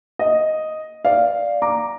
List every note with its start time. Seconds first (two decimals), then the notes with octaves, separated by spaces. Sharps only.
0.19 D#5
1.05 D5 F5
1.62 A#5 D6